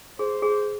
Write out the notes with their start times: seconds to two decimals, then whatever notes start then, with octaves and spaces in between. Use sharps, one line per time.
0.19 G#4 C5
0.42 G#4